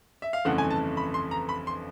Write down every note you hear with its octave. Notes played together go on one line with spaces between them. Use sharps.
E5
F5
G1 F2 C#3 E3 A3 F#5
G#5
A5
B5
C6
A#5
B5
C6